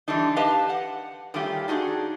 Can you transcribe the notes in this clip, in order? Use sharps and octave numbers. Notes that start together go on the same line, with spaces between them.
D3 E3 G3 D4 D#4
G4 B4 D#5 F5 A5
F#5
D#3 G3 A3 C#4 F4 G4
D4 D#4 F#4 G#4